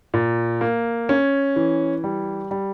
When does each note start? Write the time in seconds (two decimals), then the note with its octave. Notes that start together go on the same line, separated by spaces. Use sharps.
0.14 A#2
0.61 A#3
1.09 C#4
1.56 E3
2.04 G3
2.51 G3